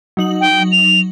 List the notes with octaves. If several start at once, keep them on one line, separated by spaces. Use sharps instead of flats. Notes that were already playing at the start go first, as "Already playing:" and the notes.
F#3 D#4 F#7
G5
F7